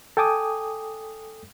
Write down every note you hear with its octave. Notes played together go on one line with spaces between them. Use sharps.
A4 G5 G#5 D6 D#6